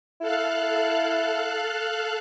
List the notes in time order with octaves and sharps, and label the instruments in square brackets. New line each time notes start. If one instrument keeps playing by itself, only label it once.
[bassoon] E4 [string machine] A4 F5 F#6